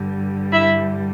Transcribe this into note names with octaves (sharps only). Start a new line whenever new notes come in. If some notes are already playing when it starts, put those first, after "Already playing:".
Already playing: G2 D3 G3
E4 E5